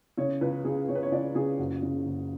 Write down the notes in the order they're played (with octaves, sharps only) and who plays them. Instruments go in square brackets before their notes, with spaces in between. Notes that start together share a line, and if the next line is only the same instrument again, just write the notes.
[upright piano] C#3 C#5
C#2 B4
C#3 G#4
C#3 C#5
B4
C#5
C#2 D5
C#3 G#4
F#1 F#4
C#3
F#1